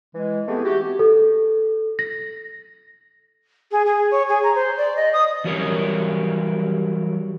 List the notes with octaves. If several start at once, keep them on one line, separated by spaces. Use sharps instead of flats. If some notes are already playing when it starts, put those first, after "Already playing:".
E3 G#3
E3 A3 B3 C4 G4 G#4
F#4 G4
A4
A#6
G#4
G#4
C#5
G#4
A#5
C5
D5
D#5
D#6
E3 F#3 G3 A#4 C#5